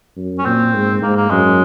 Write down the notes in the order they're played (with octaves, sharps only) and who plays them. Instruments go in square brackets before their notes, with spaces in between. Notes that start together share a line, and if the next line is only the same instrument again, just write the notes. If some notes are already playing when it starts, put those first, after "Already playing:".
[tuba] F#2
[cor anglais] C#4
[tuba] A#2 [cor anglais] C4
[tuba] G#2
[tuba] G#2 [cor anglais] A#3
[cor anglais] A#3
[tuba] F#2 [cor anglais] G#3